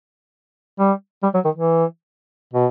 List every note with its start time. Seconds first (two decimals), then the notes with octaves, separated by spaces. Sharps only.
0.79 G3
1.23 G3
1.34 F#3
1.45 D#3
1.55 E3
2.53 B2